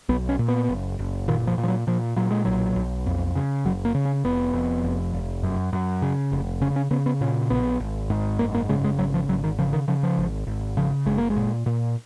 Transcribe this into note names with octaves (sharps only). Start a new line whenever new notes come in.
B1 B3
C#4
A#2
B3
F#1
F#1
A#2 D#3
F3
A#2
F3
F#3
A#2 F3
A#2 F#3
G#3
B1 F#3
B1
F2
C#3
F#1 F#3
A#3
C#3
C#4
F1 B3
F2
F1
F1
F#2
F#2
C#3
F1
C#3 C#4
C#4
C#3 B3
B3
A#2 C#4
A#1 B3
G#1
G#2
F#1 A#3
A#3
C#3 G#3
G#3
G#1 F#3
F3
G#1 F#3
D#3
C#3 F3
D#3
C#3 F3
F3
G#1
G#1
C#3 F3
F#1 G#3
A#3
G#3
A#2
A#2